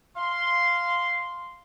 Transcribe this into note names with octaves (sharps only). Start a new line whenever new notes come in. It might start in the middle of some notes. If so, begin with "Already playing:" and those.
F5 C6